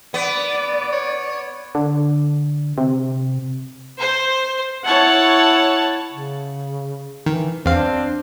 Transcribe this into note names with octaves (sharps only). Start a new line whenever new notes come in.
B3 D5
C#5
D3
C3
C5
E4 C#5 F#5 A5
C#3
D#3 E3
E2 C4 D4 F5